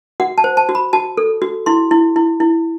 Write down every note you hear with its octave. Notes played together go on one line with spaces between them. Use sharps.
F#4 F#5
A5
C5
A5
F#4
B5
F#4 A5
A4
F#4
E4 C6
E4
E4
E4